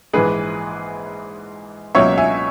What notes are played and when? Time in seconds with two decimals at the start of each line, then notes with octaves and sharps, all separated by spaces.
0.13 A#1 G#2 E3 G#4 B4
1.95 C#2 B2 F#3 A#3 C#4 C#5 E5
2.18 E5 G#5